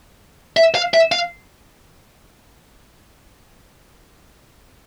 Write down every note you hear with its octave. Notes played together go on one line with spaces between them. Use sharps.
E5
F5
E5
F5